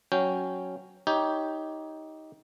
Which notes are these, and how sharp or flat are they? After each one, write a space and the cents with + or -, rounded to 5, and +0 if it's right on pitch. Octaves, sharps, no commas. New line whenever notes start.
F#3 +0 C#4 +0 G5 +0
D#4 +15 G4 +0 C#5 +10